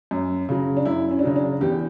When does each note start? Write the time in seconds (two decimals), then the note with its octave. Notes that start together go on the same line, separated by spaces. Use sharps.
0.11 F#2
0.49 C#3 F#3
0.76 D4
0.85 F#2 E4
1.11 C#4
1.19 D4
1.23 C#3 F#3 C#4
1.36 D4
1.61 E2 G4